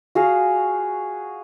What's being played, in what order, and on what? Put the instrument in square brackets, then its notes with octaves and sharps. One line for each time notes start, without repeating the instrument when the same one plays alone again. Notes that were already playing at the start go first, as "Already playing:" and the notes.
[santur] F#4 G#4 F5